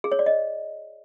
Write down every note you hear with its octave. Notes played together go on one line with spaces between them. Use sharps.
G#4
C#5
D5
D#5